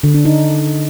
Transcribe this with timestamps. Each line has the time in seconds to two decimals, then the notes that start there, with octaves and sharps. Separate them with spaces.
0.03 D3
0.14 D4
0.25 D#4